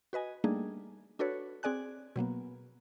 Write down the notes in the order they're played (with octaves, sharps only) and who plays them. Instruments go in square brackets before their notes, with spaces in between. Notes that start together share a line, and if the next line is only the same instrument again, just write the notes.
[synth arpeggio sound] F#4 B4 D#5 G#5
G3 A3 A#3 D4 D#4 G#4
D4 F#4 A4 B4 C#5
C4 G#4 D5 G#5 F#6
B2 F#3 A#3 B3